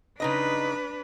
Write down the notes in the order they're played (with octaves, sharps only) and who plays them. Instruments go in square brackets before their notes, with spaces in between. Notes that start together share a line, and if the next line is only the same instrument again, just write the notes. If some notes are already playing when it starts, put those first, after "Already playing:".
[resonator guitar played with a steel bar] C#3 D#4 D#5 [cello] D4 B4